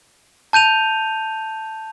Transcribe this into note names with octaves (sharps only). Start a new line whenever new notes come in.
A5 G6 D#7 F7